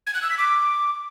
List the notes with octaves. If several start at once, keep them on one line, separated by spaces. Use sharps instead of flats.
G#6
F#6
E6
B6
D6